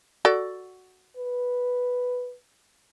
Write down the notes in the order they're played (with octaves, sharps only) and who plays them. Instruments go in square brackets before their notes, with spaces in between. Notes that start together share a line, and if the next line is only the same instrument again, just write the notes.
[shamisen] F#4 A4 D5
[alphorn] B4